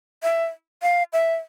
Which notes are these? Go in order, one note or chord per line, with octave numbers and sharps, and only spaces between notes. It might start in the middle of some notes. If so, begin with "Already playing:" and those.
E5
F5
E5